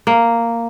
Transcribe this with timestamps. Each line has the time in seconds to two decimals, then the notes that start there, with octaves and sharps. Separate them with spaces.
0.07 A#3